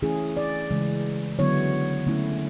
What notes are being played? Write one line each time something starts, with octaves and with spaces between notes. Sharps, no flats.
E3 A3 C#4 E4 G#4
D5
C#3 E3 G#3
D3 F#3 B3 E4 C#5
D3 A3 C#4 E4